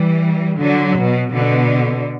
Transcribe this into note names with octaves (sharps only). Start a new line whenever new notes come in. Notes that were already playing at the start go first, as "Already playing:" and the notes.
Already playing: E3 G3
D3 F#3
B2
B2 D3